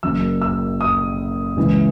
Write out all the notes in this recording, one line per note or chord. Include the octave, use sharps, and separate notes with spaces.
F#1 F#2 C#3 F#3 E6
E6
D#6
C#2 C#3 E3 G#3